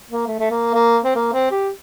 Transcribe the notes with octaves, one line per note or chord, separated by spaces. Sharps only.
A#3
A3
A3
A#3
A#3
C4
A#3
C4
G4